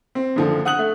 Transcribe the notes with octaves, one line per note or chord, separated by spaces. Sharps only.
C4
F#1 D3 F3
F#5 D#6 F#6 F#7
A3